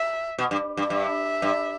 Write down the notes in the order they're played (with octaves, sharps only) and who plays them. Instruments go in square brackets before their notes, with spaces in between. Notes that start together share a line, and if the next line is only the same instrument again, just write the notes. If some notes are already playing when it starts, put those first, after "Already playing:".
Already playing: [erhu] E5
[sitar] B2
G2
G2
[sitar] G2 [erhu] E5
[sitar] G2